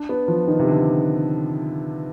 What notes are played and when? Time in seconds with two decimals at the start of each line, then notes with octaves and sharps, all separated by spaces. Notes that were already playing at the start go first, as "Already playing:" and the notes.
Already playing: D4
0.09 B3
0.28 F3
0.48 D#3
0.59 C3
0.68 D3